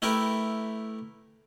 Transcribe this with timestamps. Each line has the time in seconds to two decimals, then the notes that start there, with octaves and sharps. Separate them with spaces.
0.02 A3 E4 G4 A#4 B4